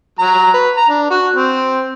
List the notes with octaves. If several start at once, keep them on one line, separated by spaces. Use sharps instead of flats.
F#3 A#5
B4
A#5
D4
F#4
C4